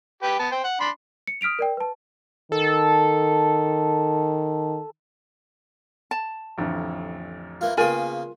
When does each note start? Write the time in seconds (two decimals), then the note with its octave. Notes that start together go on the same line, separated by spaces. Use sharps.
0.23 G4 B4 G5
0.39 B3 A5
0.52 C5 G5
0.64 F#5
0.80 D4 B5 C6
1.27 C#7
1.41 D#6 F6 B6 D7 F7
1.59 A#4 D5 G5
1.77 B4 A5
2.52 D#3 A4
6.11 A5
6.58 A1 F2 D3
7.61 E3 A#3 F4
7.77 C#3 A#3 B3 F4 G#4 A#4 G5 G#5